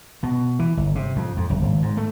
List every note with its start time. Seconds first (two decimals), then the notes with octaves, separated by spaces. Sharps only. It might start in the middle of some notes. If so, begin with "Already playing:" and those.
0.23 B2
0.59 E3
0.77 G1
0.95 C3
1.16 F2
1.37 F2
1.50 F#1
1.63 G#1
1.82 G#2
1.97 A3